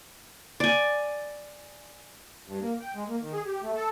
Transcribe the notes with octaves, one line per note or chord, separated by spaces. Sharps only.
D5 G#5
G2
A#3
G5
G#3
A#3
D#3
G#4
G4
A3
A4